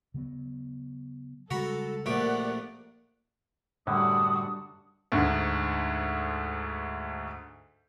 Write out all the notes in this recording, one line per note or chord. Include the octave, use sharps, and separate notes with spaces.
C#3 F#3 B3
C#3 G3 G#3 F#4 A4 A#5 B5
A#1 A3 G4 A#4 D5 F#5
F#2 A2 D3 G3 D4 F#4 D#6
D2 G#2 D3